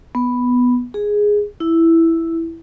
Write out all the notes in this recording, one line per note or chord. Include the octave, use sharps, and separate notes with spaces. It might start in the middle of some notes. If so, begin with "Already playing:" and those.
B3
G#4
E4